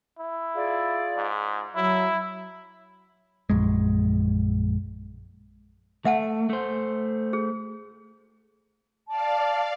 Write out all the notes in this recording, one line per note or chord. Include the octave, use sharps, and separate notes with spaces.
E4
F4 G#4 D5
G#2
F#3 E4
A#1 F#2 G#3
A3 E5 F#5 A5
A3 C5
G#4
D5 F5 A5